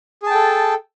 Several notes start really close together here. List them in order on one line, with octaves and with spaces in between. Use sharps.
G#4 A5 G5 A4